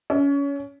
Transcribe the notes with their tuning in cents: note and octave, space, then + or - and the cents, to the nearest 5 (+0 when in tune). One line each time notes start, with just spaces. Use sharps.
C#4 +25